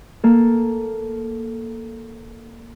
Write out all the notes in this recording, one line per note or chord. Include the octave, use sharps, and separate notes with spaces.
A#3 A4